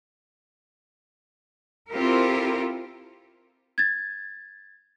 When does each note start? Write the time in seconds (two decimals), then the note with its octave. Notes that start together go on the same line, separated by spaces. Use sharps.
1.90 C4 E4 F4 G4 A4 A#4
3.78 G#6 A6